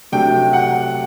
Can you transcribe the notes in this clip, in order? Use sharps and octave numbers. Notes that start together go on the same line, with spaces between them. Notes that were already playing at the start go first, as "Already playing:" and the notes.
C3 F#3 A3 D4 G5
F#5